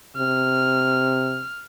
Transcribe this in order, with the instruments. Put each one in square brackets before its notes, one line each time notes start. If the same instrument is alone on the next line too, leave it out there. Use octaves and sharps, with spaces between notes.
[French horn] C3 [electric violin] F6